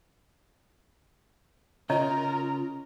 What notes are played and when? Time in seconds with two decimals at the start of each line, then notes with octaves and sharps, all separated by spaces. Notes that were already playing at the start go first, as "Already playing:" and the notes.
1.90 C#3 F4 A#4 C#5 D#5 A#5